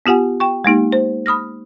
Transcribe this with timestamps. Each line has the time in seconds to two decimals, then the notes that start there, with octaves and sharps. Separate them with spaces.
0.06 B3 F4 G4 F#5 G#5
0.40 G5 C#6
0.65 G#3 A#3 D#4 G4
0.92 C5
1.26 B5 D#6 F6 A#6